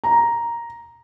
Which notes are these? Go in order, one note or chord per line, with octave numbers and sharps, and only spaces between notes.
A#5